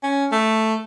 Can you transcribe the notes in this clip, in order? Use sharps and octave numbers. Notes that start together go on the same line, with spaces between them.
C#4
A3